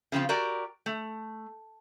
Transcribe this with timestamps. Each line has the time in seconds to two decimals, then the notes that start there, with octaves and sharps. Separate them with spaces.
0.12 C#3 F3 C4 F4
0.29 F#4 G4 A#4 D5
0.86 A3